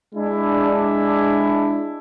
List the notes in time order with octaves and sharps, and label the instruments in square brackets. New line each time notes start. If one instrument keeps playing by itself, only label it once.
[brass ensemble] G#3 D4 E4